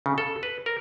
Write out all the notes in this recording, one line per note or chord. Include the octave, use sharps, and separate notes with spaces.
C#3
A4
B4
A#4